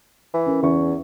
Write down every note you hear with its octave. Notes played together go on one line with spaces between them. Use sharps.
E3
C#4 A#4
E2 E3 C#4 C#6